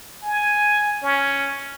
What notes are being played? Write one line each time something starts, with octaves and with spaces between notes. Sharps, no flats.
G#5
C#4